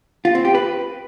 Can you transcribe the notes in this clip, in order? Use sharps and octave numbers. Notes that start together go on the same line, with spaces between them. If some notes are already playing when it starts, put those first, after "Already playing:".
F4
C4
G4
B4